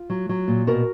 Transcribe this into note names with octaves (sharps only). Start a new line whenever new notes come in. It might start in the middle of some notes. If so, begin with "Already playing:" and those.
Already playing: F4
F#3
F#3
A#2
B2 F#4 A#4